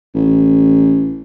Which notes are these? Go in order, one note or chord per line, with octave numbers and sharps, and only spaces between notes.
A1